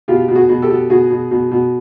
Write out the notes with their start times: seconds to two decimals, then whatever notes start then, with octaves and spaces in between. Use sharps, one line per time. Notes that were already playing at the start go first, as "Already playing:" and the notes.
0.08 B2 F4 G4
0.28 B2
0.35 F#4 G#4
0.49 B2
0.62 G4 A4
0.69 B2
0.90 B2 F#4 G#4
1.10 B2
1.31 B2
1.51 B2